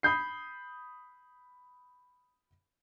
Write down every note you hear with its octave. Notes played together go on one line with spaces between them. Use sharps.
B5 D#6 G6 C7